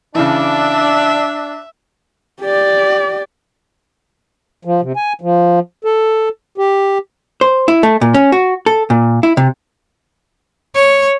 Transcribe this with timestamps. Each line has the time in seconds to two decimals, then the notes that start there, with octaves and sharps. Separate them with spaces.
0.15 C#3 E3 D4 E5
2.41 G4 D5
4.65 F3
4.82 C3
4.96 G#5
5.21 F3
5.85 A4
6.58 G4
7.41 C5
7.68 E4
7.83 A3
8.01 A#2
8.14 C#4
8.32 F#4
8.66 A4
8.90 A#2
9.23 E4
9.37 C3
10.76 C#5